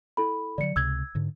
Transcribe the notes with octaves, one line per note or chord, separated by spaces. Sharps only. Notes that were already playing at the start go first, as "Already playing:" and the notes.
E4 A4 B5
D3 F3 F#3 D5 C#7
C#2 C3 E6 G#6
G#2 D3